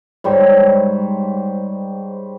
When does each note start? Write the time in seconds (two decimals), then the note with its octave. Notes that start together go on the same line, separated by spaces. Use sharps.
0.24 G#2 G3 C5 C#5